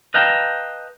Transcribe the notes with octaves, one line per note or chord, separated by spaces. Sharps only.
B4 D#5 F5 G5 A5 A#5